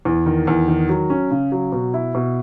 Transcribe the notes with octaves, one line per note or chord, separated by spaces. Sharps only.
E2
D#3
E2
D#3
F#3
C#4
C#3
F#3
B2
E4
B2